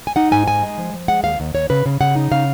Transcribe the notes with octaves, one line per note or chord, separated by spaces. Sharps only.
G#5
D#4 F#5
G#2 G#5
D#4 G#5
G#3
F3
F3
G#3 F#5
D#2 F5
D#2
D#2 C#5
C#3 B4
C#3
C#3 F#5
D#4
C#3 F5